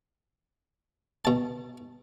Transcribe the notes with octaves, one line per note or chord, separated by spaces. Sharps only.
B2 A5